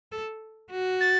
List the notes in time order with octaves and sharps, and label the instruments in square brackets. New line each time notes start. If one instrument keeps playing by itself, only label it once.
[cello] A4
F#4
[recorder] A6